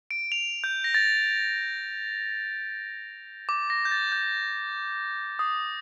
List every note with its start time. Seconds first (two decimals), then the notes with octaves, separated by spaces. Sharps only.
0.11 D7
0.32 F7
0.64 G6
0.84 A#6
0.94 A6
3.49 D6
3.70 A#6
3.85 G6
3.91 A6
4.12 G6
5.39 D#6